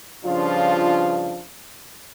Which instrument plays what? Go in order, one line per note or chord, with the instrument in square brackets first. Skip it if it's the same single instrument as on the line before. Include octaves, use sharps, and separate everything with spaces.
[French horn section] G2 C#3 F3 D4 F4